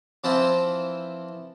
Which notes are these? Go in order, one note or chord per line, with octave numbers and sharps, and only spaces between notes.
E3 F3 C4 E4 F4 C5